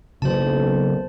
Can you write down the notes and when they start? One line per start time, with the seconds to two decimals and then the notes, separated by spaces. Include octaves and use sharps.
0.22 F#1 B1 C#3 F#3 C5 A5